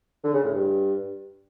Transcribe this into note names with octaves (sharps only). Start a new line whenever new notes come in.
D3
C#3
A2
G2